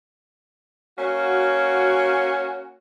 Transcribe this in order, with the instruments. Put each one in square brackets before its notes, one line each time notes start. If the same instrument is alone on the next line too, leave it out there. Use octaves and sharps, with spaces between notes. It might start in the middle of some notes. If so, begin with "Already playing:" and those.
[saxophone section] A#3 C#4 F#4